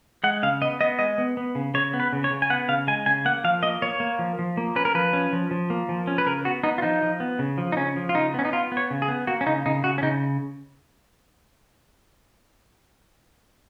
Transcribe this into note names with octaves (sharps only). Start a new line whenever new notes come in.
G#3 F#5
C#3 F5
B3 D#5
B3 D#5
G#3 D#5
B3
B3
C#3
C#3 C#5
B3
B4
C#3
C#5
C#3
G#5
B3 F#5
C#3 F5
G#3 G#5
C#3 G#5
A#3 F#5
F3 F5
A#3 D#5
A#3 C#5
A#3
F3
F3
A#3
C#4 B4
A#4
F3 B4
C#4
F3
F3
A#3
F3
C#4
B4
C#3 A#4
B3 F#4
B3 D#4
F4
F3 D#4
F3
B3
C#3
F3
D#4
C#3 C#4
F3
F4
C#3 D#4
B3 C#4
D#4
B3 F4
B3
C#5
C#3
G#4
B3
A#3 F#4
C#4
C#3 D#4
C#3 D#4
C#3 F#4
C#4
C#3 D#4